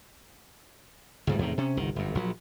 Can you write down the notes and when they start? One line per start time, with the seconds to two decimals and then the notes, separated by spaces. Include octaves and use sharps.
1.27 C#2 G#2 G3
1.39 E2 A2 C3 D#3
1.58 C3 C#4
1.77 G1 C2 D#3
1.96 G1 F#2
2.15 A#1 F#3